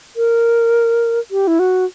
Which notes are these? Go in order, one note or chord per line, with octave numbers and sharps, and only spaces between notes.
A#4
G4
E4
F#4